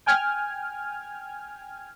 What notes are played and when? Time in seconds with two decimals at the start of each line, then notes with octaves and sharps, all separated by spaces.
0.06 G5 G#5 F6 G#6